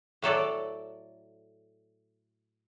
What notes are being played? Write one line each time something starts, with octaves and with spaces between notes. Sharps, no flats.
A2 F#3 A4 D5